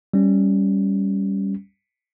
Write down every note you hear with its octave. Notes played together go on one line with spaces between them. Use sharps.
G3 C#4